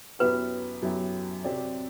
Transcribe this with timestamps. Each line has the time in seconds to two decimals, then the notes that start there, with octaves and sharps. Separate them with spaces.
0.19 F#2 F#3 B3 E4 G4 B4
0.82 F#2 F#3 B3 E4 G4
1.44 C3 F#3 C4 G4 D5